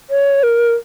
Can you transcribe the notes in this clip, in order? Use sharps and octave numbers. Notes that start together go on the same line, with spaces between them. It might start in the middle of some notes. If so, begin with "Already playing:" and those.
C#5
A#4